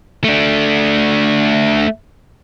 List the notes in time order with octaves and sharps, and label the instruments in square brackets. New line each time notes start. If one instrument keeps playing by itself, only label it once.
[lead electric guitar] A3 D4